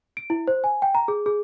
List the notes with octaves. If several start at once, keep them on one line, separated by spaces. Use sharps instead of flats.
D7
E4
C5
G#5
G5
A#5
G#4
G#4